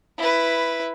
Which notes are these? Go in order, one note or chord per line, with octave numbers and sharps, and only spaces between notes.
E4 B4